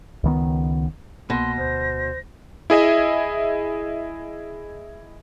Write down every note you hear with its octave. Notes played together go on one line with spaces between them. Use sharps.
C#2 D#3 B3
C2 B2 A#3 C6 A#6
D2 C5
E4 G#4 D#5 E5